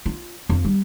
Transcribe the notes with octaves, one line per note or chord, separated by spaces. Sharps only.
F4
F2
G3